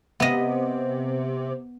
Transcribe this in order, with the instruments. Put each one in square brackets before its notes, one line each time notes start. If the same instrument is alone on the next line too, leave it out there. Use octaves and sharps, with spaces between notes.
[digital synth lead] C3 [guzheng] B3 D#5